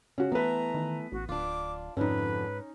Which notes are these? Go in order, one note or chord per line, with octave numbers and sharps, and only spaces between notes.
C#3 C#4 F#4
E3 A3 B3 B4 A#5
D#3
A1 F#4
D1 D4 F4 D6
F2 G#2 D3 C#4 D#4 B4